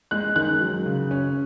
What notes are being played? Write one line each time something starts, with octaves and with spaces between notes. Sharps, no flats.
G#3 F#6
D#3 F#6
F#3
C#3
C#4